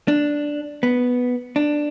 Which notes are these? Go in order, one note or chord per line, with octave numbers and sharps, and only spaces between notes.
D4
B3
D4